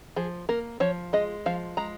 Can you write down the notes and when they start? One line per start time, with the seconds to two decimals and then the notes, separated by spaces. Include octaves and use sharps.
0.16 F3 G#4
0.49 A#3 A#4
0.80 F3 C#5
1.13 G#3 D#5
1.46 F3 F5
1.77 G#3 A#5